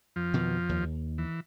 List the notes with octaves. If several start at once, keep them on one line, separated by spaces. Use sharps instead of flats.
F2 F3
B2 D#3 E3
D#2
E3